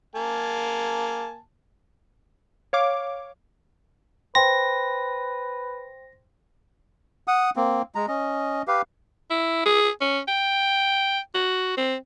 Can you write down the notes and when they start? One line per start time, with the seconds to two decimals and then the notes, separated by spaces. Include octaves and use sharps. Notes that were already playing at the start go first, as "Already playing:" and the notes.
0.15 A#3 G#5 A5
2.73 C#5 F5 D6
4.35 B4 C5 G5 C6 A#6
7.28 F#5 D#6
7.56 A#3 C4
7.95 G#3 A#5
8.08 C#4 D#5
8.68 G4 B4 F5
9.31 E4
9.66 G#4
10.01 C#4
10.28 G5
11.35 F#4
11.77 C4